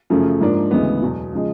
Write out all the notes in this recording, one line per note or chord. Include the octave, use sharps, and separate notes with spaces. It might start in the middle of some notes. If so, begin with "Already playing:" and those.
F#2 C#3 F3 A3
G#2 F3 A#3 D4
D2 C#3 E3 G#3 B3
E2 B2 F#3
C#3 F3 G#3